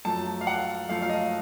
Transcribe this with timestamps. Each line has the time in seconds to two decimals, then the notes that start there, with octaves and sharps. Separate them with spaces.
0.05 F#2 F3 A3 A5
0.41 F5
0.47 F#5
0.89 F#2 F3 A3 F5
1.02 F5
1.09 D#5